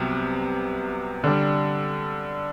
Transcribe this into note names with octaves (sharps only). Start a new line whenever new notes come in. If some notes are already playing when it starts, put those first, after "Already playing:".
Already playing: C2 C3 F#3 B3
D3 G3 D4